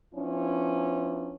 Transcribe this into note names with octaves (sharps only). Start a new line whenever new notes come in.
F3 B3 C#4 D4 E4